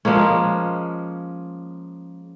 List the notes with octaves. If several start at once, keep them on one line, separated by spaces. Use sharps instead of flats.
F3 G#3 A#3 C#4